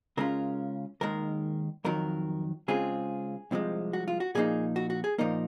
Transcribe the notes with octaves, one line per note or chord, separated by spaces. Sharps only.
C#3 G#3 C#4 F4 A#4
D#2 D#3 G#3 A#4
F2 D#3 F#3 A#4
C#3 G#3 C4 F4 G#4
C2 C3 F3 G#3
F#4
F4
F#4
A#2 F3 A#3 D#4 G#4
F#4
F#4
G#4
A#2 F3 A#3 D#4 A#4